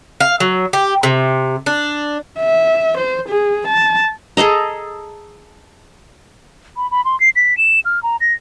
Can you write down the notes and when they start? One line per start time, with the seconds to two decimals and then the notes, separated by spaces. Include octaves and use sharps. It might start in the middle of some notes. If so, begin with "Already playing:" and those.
0.20 F5
0.40 F#3
0.73 G4
1.03 C3
1.66 D4
2.40 E5
2.98 C5
3.29 G#4
3.67 A5
4.37 G#4 A4 D#5 A#5
6.77 B5
6.91 B5
7.05 C6
7.20 C7
7.36 B6
7.57 E7
7.85 F6
8.03 A#5
8.21 A#6